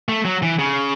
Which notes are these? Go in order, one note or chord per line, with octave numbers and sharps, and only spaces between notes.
A3
F#3
E3
C#3